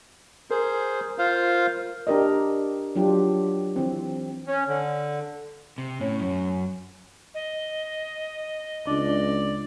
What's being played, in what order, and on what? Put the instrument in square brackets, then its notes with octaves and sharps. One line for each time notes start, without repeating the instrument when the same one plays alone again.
[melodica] G#4 C5 [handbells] A#4
[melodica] F4 C5 F5
[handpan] D4 G4 A#4 D5 D#5
F#3 D4 F4 G4
E3 C4
[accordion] C#4
D3
[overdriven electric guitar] C3
[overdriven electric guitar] A2 [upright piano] C#4
[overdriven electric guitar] F#2
[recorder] D#5
[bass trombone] C#2 [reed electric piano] D4 [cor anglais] D5